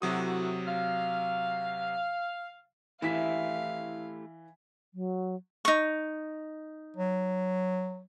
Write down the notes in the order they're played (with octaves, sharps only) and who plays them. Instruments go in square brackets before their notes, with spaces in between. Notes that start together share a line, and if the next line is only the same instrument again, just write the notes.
[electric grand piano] C3 F#3 D#6 [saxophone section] A3 E4 F#4
[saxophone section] F5
[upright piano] E3 B6 [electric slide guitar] A3 E4 G4 [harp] E5 [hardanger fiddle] F5
[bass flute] F#3
[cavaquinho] D#4 C#6
[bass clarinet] F#3